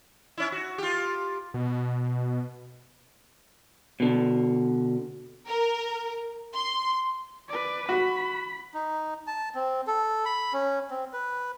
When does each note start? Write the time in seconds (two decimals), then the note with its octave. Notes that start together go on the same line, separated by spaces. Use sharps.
0.37 C#4 E4
0.52 F#4
0.78 F4 G4
1.54 B2
4.00 B2 D3
5.46 A#4
6.55 C6
7.48 B4 D5
7.89 F#4 B5
8.74 D#4
9.27 A5
9.55 C4
9.87 A4
10.25 B5
10.53 C#4
10.91 C4
11.13 B4